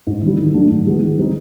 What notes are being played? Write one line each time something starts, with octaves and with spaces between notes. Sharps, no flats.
G#2
E3 G3
D#3
F#3 A3 D4
G#2
E3 G#3 B3
D#3
G3 C4 D#4